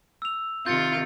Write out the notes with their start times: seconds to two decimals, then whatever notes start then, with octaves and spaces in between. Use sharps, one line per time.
0.22 E6 F7
0.66 C3 D#3 F4 G6 A6 C#7